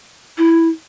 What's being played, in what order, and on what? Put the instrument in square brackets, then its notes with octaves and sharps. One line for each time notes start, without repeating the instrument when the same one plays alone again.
[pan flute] E4